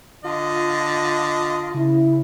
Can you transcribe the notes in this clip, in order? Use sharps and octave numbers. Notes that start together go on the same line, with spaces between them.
D3 F4 D#5
C#3 E4